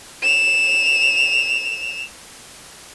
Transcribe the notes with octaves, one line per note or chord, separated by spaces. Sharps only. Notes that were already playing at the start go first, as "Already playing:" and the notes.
E7 F7